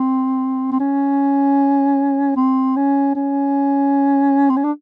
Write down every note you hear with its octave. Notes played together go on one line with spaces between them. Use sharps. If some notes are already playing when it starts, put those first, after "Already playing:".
Already playing: C4
C4
C#4
C4
C#4
C#4
C4
C#4
D4